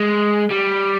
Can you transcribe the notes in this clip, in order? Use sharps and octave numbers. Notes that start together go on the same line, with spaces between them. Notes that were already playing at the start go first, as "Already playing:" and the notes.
Already playing: G#3
G3